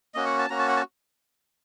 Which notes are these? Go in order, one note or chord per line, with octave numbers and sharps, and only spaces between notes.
A#3 C#4 F#4 D#5
F#5
A5
A#3 C#4 F#4 A#5
A5
F#5
A5